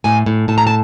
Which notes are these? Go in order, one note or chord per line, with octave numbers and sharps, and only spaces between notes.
A2 G#5
A2
A2 A5
A#5
A5